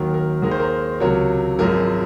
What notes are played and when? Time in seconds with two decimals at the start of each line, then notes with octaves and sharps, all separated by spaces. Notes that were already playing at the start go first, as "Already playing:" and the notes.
Already playing: D#2 D#3 F#3 A#4
0.14 A#4
0.42 D#2 D#3 G#3 A#4
0.51 C5
0.59 A#4
1.00 C#2 C3 F#3 A#4 C#5
1.59 G#1 F#2 F3 G#3 A#4